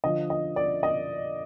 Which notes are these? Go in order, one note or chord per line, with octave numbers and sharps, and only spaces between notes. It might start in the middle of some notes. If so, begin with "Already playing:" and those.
D3 F3 D#5
D#5
D5
D#5